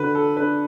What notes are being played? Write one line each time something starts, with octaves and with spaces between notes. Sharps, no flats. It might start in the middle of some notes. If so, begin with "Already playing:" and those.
Already playing: D3 F#4 B4
A4
D4 B4